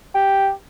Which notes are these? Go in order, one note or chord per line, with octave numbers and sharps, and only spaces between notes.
G4